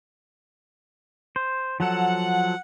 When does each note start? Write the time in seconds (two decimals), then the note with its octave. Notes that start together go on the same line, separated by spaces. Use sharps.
1.36 C5
1.80 F3 F#3 A4 F#5